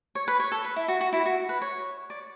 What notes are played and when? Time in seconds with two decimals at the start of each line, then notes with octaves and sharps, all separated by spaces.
0.15 C#5
0.28 B4
0.40 C#5
0.52 A4
0.64 B4
0.76 E4
0.88 F#4
1.01 F#4
1.13 E4
1.26 F#4
1.49 B4
1.62 C#5
2.10 D5